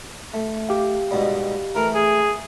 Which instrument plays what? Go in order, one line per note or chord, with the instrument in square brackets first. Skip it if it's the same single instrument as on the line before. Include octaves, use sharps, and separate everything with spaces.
[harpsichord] A3
[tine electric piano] G4 F5
[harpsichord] G#2 B2 G3
[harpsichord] E3 A3 E4 [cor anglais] A#4
[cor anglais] G#4